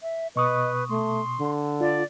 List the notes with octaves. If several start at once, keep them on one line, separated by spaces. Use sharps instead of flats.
E5
B2 B4 D#5 C#6 D#6
A3 C6
D3
F4 D5